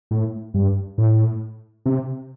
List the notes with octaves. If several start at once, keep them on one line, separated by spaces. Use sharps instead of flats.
A2
G2
A2
C3